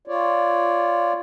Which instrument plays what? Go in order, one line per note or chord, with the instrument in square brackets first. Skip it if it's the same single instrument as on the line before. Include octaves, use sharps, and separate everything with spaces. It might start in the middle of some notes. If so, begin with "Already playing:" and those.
[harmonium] F4 C#5 D5